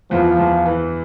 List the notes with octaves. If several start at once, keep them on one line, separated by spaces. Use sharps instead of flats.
E2 F3
E2
E3